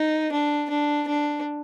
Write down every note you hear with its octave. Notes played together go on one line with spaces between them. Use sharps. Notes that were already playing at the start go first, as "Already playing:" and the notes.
Already playing: D#4
D4
D4
D4